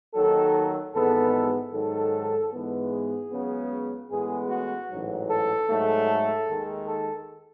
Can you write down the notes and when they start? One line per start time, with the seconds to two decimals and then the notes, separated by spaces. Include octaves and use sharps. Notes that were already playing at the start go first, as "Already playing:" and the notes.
0.14 D#2 D#3 F#3 A4
0.93 G#1 G#2 E3 G#3 B3 A4
1.72 G#2 D#3 F#3 A4
2.52 G#2 E3 G#3 B3
2.90 G#4
3.30 C#2 C#3 F#3 B3
4.10 A1 A2 G#3 B3 G#4
4.50 F#4
4.90 A1 G#2 F#3
5.29 A4
5.69 G#2 F#3 A3
6.08 A4
6.48 D#2 D#3 G#3
6.87 A4